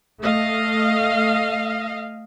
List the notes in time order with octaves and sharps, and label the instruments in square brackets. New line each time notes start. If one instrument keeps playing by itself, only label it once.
[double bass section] A3 [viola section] D#5 F5